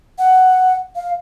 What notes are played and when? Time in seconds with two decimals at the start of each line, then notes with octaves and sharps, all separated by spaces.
0.19 F#5
0.96 F5